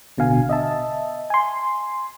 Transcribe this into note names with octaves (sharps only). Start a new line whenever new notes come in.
A1 B2 D3 F5 G#5
D#5 E5 A5
G#5 C6